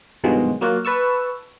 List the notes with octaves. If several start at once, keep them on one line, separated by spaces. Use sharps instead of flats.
G2 B2 D#3 F3 F#3 G#3
F#3 A#3 F4 F#4
B4 A5 C#6 E6